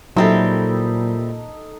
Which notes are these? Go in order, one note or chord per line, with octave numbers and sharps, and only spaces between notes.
A#2 F#3 G3 C4 D#4 E4 A4